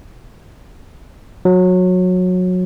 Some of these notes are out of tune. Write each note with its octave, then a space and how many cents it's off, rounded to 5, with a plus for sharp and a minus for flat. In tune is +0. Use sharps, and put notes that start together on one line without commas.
F#3 -20